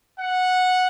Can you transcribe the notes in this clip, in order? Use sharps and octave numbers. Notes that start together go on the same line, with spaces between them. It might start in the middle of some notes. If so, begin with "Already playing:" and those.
F#5